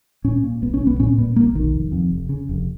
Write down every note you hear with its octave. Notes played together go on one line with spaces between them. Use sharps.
A#2 C#4
A#2
B1 B3
C#4
B1
B3
A#2 C#4
A#2 B3
B1 A#3
B1 D#3
F1
F2
F1
C#3
F1